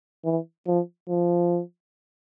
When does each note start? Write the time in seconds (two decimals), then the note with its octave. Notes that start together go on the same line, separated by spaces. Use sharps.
0.25 E3
0.67 F3
1.09 F3